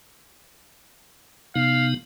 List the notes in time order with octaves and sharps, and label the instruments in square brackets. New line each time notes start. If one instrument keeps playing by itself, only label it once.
[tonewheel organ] C3 B3 D#4 [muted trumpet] F5